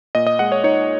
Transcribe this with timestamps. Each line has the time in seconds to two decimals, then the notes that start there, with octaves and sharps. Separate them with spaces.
0.15 A#2 D#5
0.27 D#5
0.39 G#3 F#5
0.52 C#5
0.64 D#4 C#5